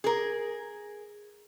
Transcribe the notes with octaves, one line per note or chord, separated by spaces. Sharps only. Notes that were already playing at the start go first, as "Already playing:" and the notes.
G#4 A#4